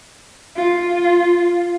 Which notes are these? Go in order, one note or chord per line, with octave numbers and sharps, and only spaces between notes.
F4